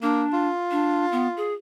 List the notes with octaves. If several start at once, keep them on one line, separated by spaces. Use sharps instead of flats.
A#3 D4
F4
D4
B3
G#4